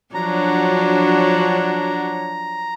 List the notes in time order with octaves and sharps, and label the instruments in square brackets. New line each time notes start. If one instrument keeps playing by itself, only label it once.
[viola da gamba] F3 F#3 C#5 [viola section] D4 F#4 [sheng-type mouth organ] A#5